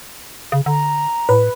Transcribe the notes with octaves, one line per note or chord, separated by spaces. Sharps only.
C#3
D3 A#5
A2 B4